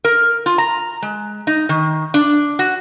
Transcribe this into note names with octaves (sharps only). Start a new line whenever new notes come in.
A#4
F4
A#5
G#3
D#4
D#3
D4
F#4